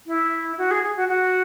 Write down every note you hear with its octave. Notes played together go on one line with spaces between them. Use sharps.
E4
F#4
G#4
G#4
F#4
F#4